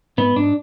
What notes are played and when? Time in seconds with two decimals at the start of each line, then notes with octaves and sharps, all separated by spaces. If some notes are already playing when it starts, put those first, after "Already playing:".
0.18 G#2 B3
0.36 G#2 D4